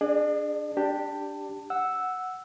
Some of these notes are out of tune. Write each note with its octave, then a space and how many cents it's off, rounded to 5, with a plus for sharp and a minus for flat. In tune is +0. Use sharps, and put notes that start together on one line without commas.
D4 +0 G#4 +0 D5 +40
D4 +0 G4 +0 A5 +20
F#5 -5 E6 +0